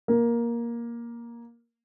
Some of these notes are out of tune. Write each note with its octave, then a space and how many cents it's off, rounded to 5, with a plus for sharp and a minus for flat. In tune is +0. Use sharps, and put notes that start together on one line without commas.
A#3 +10